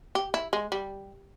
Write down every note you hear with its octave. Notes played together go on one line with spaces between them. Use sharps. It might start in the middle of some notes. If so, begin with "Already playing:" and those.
G4
E4
G#3
G3